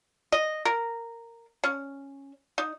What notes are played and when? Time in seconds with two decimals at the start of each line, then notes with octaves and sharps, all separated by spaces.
0.32 D#5
0.65 A#4
1.64 C#4
2.58 D#4